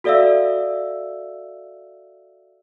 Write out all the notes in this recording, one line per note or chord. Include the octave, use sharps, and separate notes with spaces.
F#4 A4 D5 E5 F5 E6